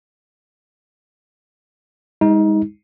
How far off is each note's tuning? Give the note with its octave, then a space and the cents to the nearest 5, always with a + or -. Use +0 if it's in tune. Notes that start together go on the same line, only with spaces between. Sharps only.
G#3 -30 D#4 +25